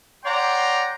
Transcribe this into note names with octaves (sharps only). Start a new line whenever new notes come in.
C#5 D5 F#5 G5 A#5 C6